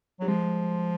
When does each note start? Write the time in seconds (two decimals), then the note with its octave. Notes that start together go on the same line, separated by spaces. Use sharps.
0.20 F#3 G3
0.27 F3 G#3